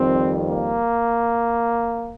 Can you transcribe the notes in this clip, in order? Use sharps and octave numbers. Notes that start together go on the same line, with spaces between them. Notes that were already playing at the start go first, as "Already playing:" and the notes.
Already playing: F2 D#3 G3 C4
A#3